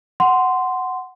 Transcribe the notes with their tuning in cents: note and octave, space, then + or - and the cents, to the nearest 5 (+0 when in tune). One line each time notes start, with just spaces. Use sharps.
F#5 +5 C6 -10